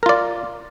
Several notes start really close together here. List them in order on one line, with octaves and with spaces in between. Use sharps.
A#4 F4 D5